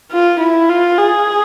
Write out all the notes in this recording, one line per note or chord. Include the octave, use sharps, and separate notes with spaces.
F4
E4
F4
G#4